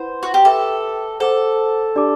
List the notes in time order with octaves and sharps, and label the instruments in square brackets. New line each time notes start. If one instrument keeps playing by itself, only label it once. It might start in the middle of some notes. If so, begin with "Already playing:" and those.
Already playing: [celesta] E4 B4 F#5 B5 [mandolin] C5
[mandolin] F#4
G4
[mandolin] A4 [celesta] B4 E5 B5 D6
[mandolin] A4 [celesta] C5 F#5 A5 D6
[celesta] D4 G4 D5 A5 D6